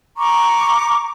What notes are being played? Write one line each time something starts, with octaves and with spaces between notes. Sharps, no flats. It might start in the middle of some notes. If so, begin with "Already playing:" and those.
A#5 C#6 D6